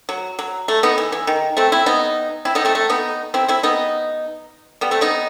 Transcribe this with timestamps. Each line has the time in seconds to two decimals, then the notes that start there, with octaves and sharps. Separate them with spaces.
0.09 F#3
0.39 F#3
0.68 A3
0.83 B3 D#4
0.98 E3
1.12 E3
1.27 D#3
1.57 A3 C4
1.72 C4 E4
1.86 B3 D#4
2.45 C4 E4
2.55 B3 D#4
2.65 A3 C4
2.75 A3
2.89 B3 D#4
3.34 C4 E4
3.48 C4 E4
3.63 B3 D#4
4.81 G3 B3
4.91 A3 C4
5.01 B3 D#4